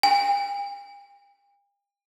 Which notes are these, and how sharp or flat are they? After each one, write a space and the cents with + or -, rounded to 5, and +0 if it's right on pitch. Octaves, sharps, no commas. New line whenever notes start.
G5 +45